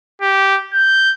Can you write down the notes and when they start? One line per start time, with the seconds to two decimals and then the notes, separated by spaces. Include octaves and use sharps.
0.22 G4
0.74 G6